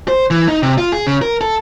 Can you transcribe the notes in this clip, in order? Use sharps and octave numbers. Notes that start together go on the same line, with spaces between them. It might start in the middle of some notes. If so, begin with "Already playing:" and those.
C5
E3
D#4
C3
F4
G#4
C#3
A#4
A4